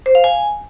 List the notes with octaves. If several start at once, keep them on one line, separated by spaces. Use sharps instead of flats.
C5
F5
G#5